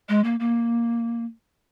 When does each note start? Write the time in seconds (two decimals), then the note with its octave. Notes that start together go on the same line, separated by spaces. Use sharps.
0.09 G#3
0.24 A#3
0.40 A#3